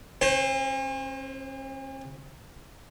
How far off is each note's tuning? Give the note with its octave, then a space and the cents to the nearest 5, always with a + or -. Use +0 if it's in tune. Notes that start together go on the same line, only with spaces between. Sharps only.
C#4 -45 C5 +0